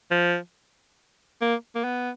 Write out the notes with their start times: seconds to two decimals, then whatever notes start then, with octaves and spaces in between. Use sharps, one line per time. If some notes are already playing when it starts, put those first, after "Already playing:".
0.11 F3
1.41 A#3
1.75 A#3
1.84 B3